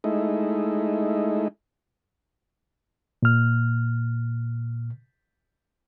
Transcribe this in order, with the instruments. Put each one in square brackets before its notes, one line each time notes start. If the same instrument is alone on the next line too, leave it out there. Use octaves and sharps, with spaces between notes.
[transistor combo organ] G#3 A3 D#4 E4
[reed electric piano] A#2 F6